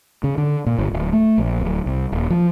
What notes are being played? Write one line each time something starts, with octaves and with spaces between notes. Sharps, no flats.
C#3
D3
A#2
G1
D1
A3
A#1
D1
C2
D#1
F3